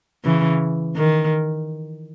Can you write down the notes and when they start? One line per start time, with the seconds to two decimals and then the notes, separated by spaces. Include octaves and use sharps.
0.24 C#3 E3
0.96 D#3